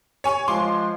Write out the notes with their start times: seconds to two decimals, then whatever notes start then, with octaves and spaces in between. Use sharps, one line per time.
0.24 C#5 G#5 C#6
0.48 F3 G#3 C6 D6